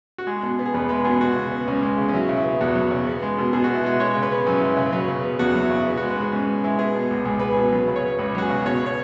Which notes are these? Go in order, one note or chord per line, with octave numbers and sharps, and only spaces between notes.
F#4
G#3 G#4
B2
B3
G#4
E2 B4
G#3 B4
B2 G#4
G#3 F#4
C#3
B3
C#2 C#4
G#3
C#3
C#4
F#3 E4
C#3
E4
B3
E2 F#4
F#3
C#3
B3
G#3
B2
B2 G#4
B3 F#4
E4
G#3 F#4
G#3 C#5
C#3
B4
B3
F#2 C#4
E4
G#3
C#3 B4
F#3 B4
C#3
B3
E2 F#4
F#3
E4
C#3
B3
F#4
G#3
B4
G#2 G#4
G#2 C#4
B3
G#3 E4
B3 G#4
B2
C#2
C#2 G#4
B3 B4
B2 G#4
F#3 B4
C#3
C#5
B3
C#2 B4
F#3 F#4
G#4
C#3
B2 C#5
B3
C#5